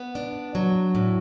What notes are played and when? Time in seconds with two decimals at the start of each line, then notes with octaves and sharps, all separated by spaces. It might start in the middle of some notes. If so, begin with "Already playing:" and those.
Already playing: B3
0.15 D4
0.55 F#3
0.95 A2